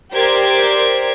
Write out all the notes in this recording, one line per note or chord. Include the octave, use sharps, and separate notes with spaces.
G4 A#4 C5 D5 G#6